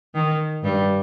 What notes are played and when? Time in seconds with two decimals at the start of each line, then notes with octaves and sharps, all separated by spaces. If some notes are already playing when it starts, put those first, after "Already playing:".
0.15 D#3
0.63 G2 G3